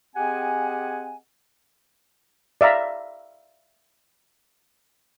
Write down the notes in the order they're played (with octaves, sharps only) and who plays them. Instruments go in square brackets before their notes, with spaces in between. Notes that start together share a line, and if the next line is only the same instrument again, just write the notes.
[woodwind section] C4 G4 G#4 D#5 F#5 G#5
[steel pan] D5 E5 F5 A#5